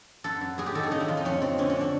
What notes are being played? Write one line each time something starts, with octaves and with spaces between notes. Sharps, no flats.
F#2 A4
F#2
F#2 G#4
G4
D#3 A4
G#4
C#3 D#4
E4
F2 F4
D#4
F2 C#4
C#3 C4
D3 C#4
C#4
D3
D4